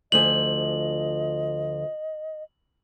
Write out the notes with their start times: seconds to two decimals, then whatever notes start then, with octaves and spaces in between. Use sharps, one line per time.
0.12 D2 F3 D#5 G#5 F#7